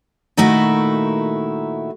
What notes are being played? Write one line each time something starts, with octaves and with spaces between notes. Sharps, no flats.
A#2 D#3 A3 D#4 E4 F#4